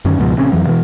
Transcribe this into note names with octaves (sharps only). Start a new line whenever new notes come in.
F#2 D3 D#3 C#4
C#2 G#2 B2 F3
A1 C3 C#4
F2 E3 F#3
B2 E3